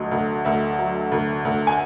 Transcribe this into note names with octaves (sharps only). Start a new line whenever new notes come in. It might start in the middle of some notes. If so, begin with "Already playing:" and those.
Already playing: D2 F#3 D#5
D2
D2 E5
F#3
D2
D2
G#5